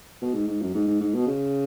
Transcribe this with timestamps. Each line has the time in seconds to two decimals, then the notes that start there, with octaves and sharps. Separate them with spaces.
0.22 B2
0.34 G#2
0.48 G#2
0.62 F#2
0.75 G#2
0.87 G#2
1.00 G#2
1.15 B2
1.27 C#3